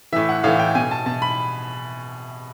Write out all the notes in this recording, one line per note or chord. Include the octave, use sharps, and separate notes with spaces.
A2 E3 E5
F#5
A2 E3 F5
G5
B2 G#5
A5
B2 A5
B5